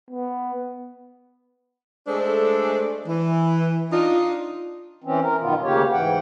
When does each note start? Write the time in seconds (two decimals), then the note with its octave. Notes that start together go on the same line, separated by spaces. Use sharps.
0.11 B3
2.08 G#3 A3 D4 A4 C5
3.07 E3
3.91 D4 D#4 F4
5.04 E3 C4 C#4
5.23 A#4
5.40 F#2 B2 D#3 B3 F4
5.63 D2 C#3 A#3 G4 C#5
5.92 G#2 E3 F#5 G5